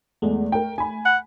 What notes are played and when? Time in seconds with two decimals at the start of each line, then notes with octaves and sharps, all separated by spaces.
0.22 E2 G#3 A3
0.52 A#4 G5
0.78 G#5 B5
1.06 F#5